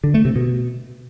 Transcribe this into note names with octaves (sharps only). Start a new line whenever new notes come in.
D3
A3
C3
B2